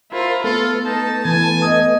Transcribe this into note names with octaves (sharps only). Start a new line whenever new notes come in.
E4 F4 A#4 C5
A3 B3 F4 A4
D#4 A5
E3 G#5
D#5 D#6